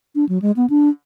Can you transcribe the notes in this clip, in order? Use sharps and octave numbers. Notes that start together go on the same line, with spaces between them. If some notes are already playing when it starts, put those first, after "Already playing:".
D4
F#3
G#3
B3
D4